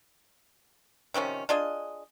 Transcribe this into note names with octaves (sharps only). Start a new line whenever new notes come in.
C3 D#3 F3 C#4
D4 F4 G#4 D#5